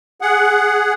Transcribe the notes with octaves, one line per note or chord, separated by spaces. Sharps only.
G#4 F#5